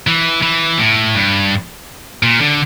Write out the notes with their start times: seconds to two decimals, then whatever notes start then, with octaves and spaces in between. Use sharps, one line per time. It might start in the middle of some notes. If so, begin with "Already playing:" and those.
0.07 E3
0.42 E3
0.79 A2
1.15 G2
2.23 A#2
2.41 D3